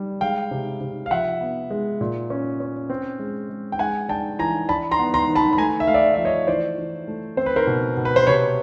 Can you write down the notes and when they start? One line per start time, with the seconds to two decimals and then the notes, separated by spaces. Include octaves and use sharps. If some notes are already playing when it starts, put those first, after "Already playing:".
Already playing: G3
0.21 G#3 F5 G5
0.51 C3
0.81 C3
1.06 F5
1.11 F3 E5 F#5
1.41 B3
1.70 G#3
2.01 A#2
2.30 C#4
2.60 C#4
2.90 C4
3.19 G#3
3.49 G#3
3.72 G5
3.79 G#3 F#5 G#5
4.09 D4 G5 A5
4.39 E3 G#5 A#5
4.69 D4 A5 B5
4.91 A#5 C6
4.99 B3
5.14 A#5 C6
5.28 D#3
5.35 A5 B5
5.53 B5
5.58 A3 G#5 A#5
5.80 E5
5.87 A3 F5
5.94 D5 E5
6.14 F3 E5
6.25 C#5 D#5
6.47 E3 C5 D5
6.78 E3
7.08 A3
7.37 C4 C5
7.46 B4
7.56 A#4 C5
7.67 B2
7.97 B2
8.05 B4
8.16 C5
8.27 C3 B4 C#5